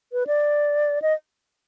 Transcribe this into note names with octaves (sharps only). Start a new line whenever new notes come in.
B4
D5
D#5